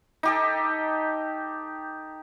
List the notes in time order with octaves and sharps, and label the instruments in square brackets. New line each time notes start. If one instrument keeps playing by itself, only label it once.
[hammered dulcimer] D#4 G4 A4